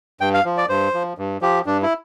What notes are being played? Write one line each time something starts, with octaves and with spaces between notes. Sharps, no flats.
G2 G5
F5
F3
D5
G2 C5
F3
G2
F3 G4
G2 D4
E4